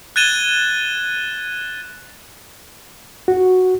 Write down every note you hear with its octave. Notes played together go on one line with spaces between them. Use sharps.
F#6 G#6 A6 D#7 E7 G7
F#4